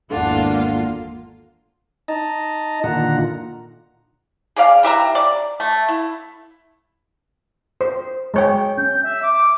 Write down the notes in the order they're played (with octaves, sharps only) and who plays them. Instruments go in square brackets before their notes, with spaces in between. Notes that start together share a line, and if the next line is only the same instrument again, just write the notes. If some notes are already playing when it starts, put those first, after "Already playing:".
[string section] G#1 E2 [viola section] A#3 F4 [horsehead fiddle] D4 [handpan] A4 F#5
[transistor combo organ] D#4 D#5 A5 A#5
A#2 D3 D#3 F4 F#5 A#5
[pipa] G#4 D5 F5
E3 G4 E5 A#5
D5
A3
E4
[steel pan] C5
G#3 C#5 G5
[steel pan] C#4 [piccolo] G6
[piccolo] E5
D6